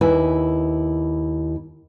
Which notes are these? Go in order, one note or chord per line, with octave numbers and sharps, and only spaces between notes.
D#2 E4 B4 G#5